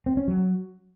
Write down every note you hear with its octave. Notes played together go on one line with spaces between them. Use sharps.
C4
C#4
F#3